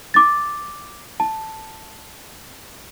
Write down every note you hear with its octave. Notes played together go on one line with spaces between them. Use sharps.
D6 A6
A5